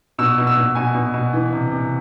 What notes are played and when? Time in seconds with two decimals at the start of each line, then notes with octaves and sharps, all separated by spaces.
0.18 B2 E6
0.38 B2
0.47 E6
0.57 B2
0.75 B2 G#5
0.94 B2
1.14 B2
1.33 E3
1.53 C3
1.72 C3